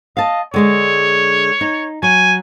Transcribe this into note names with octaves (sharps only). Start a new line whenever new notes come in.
D#5 F5 A5
D3 G#3 G#4 C#5
D#4
F#3 G#5